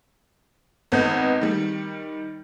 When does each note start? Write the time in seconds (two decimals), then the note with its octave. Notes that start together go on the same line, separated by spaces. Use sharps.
0.92 G#1 B3 C4 D#5 G6
1.41 D#3 G3